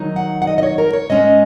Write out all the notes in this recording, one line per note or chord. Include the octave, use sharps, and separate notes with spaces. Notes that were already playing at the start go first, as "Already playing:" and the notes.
Already playing: D#3 F#3 D#4
F#5
F#5
D#5
D#5
C#5
A#4
C#5
G#2 G#3 C#4 D#5